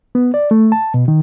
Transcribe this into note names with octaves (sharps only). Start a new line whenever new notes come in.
B3
D5
A3
A5
B2
D#3